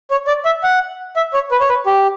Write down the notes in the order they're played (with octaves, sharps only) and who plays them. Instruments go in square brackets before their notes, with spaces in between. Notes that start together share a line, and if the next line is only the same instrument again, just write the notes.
[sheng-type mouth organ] C#5
D5
E5
F#5
E5
C#5
B4
C#5
B4
G4